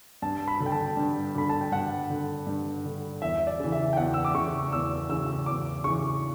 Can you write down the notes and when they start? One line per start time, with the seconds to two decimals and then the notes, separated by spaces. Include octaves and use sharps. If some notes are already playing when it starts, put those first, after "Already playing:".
0.22 G2 A5
0.48 B5
0.60 D3
0.66 G5
0.72 A5
0.97 G2
1.35 D3 B5
1.49 A5
1.61 G5
1.72 G2 F#5
2.10 D3
2.47 G2
2.85 D3
3.22 E2 E5
3.47 D5
3.60 C#3 E3
3.72 E5
3.93 G5
3.97 E2 F#5
4.14 E6
4.25 D6
4.35 C#3 E3 C#6
4.72 E2 E6
5.09 C#3 E3 E6
5.46 E2 D6
5.84 C#3 E3 C#6